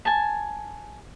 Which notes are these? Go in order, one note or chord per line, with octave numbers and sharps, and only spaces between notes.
G#5 A5